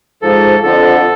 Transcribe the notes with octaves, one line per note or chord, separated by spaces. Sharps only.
G#2 F3 A4
F2 D3 F3 A4